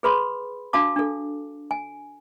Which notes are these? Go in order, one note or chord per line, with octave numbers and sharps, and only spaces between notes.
G#4 B4 B5 C6
D4 F#4 F5 A5 D6
D4 A4
G#5